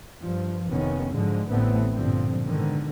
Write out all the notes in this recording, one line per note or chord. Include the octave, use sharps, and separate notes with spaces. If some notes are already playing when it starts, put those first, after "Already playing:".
G2 F3
F1 C3 D#3 B3 C#4
G#2 D3 F3 F#3 G#3
A1 A2 D3 A3 B3 C4
G2 A#2 D3 F3 C4
G#2 B2 D3 D#3